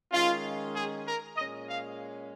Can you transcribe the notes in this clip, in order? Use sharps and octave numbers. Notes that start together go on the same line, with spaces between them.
D#3 G#3 C#4 F4
G#4
A#4
A#2 G#3 C#4 D#5
F5